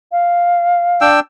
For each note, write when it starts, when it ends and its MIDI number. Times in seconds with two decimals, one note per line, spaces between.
0.12 1.08 77
1.01 1.20 62
1.01 1.20 79
1.01 1.20 88